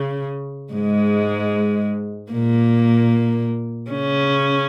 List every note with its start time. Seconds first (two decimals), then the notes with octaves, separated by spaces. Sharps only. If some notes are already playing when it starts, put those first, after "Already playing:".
Already playing: C#3
0.74 G#2 G#3
2.32 A#2 A#3
3.91 C#3 C#4